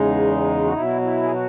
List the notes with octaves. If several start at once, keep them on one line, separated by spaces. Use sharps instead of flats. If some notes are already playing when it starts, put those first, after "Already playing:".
Already playing: E2 C#3 G#3 D#4
F#4
B2 F#3 E4
E4
G#4
F#4